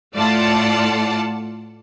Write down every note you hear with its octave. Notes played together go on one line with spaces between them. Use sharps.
A2 A3 F4 D5 F#5 A5